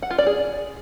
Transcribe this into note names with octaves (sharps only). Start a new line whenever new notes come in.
F#5
F4
D5
G#4